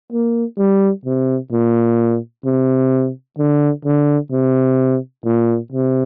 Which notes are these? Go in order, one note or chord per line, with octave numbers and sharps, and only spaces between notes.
A#3
G3
C3
A#2
C3
D3
D3
C3
A#2
C3